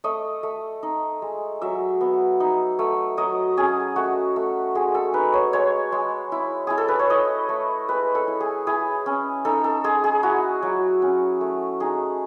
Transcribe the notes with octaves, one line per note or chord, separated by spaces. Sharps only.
A3 D#5
A3
D#4
G#3
F#3 E5
B3
D#4
A3
F#3 D#5
C#4 G#4
A3 F#4
A3
G#3 G#4
A4
D#4 B4
C#5
G#3 C#5
G#3
E4
E4 G#4
A4
B4
C#5
E4 D#5
A3
G#3 B4
A4
E4
G#4
E4 G#4
C#4
D#4 A4
A4
G#3 G#4
G#4
E4 F#4
F#3
C#4
A3
D#4 G#4